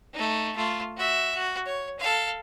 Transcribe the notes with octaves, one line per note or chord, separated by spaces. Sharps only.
A3 D#4
A3 F4
F#4 E5
F#4
C#5
A4 F5